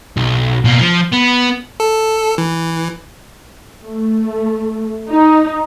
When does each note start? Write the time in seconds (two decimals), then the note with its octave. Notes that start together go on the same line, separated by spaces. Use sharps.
0.17 B1
0.65 B2 A#3
0.80 F3
1.13 B3
1.80 A4
2.38 E3
3.84 A3
5.09 D#4